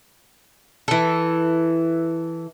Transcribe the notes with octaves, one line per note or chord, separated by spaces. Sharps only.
E3 A4